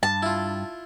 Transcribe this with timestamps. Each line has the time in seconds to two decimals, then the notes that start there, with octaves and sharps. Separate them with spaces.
0.03 G2 A5
0.23 E4 F4